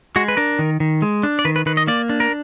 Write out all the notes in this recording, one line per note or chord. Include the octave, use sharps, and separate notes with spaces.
G#3 F#4
B4
D4 A#4
D#3
D#3
G#3
D4
D5
D#3 B4
B4
D#3 B4
D#5
A#3 D5
D4
A#4